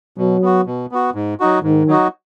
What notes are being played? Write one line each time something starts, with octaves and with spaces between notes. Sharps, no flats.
B2 F#3
B3 F#4
B2
B3 F#4
G#2
F#3 D#4 F#4
G#2 D#3
F#3 D#4 F#4